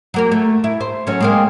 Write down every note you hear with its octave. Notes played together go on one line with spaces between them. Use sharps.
F#3 A#3 A#4
A3
E4
C5
F#3 A3 C#4
G#3 A#3 C4